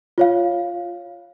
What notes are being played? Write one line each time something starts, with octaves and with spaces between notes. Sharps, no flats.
F4 C#5 F5